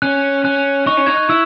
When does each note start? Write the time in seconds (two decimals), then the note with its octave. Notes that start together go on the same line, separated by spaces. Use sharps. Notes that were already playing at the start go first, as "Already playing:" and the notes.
0.02 C#4 F#6
0.44 C#4 F#6
0.87 D#4 C#6
0.97 C#4
1.06 D#4 G#6
1.17 F#6
1.30 E4 E6